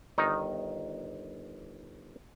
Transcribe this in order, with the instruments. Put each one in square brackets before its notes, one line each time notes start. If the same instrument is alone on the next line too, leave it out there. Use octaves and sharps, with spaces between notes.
[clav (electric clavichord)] G1 D#3 D#4